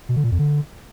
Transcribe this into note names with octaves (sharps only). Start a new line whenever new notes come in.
B2
D3
A#2
F2
D3